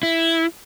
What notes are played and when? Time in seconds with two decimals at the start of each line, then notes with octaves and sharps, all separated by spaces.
0.03 E4